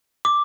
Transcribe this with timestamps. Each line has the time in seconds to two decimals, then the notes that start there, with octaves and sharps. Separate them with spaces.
0.25 D6